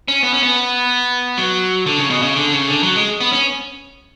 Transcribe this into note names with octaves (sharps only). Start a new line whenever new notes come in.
C#4
B3
C#4
B3
F#3
D3
C#3
B2
C#3
D3
C#3
D3
F#3
G#3
B3
C#4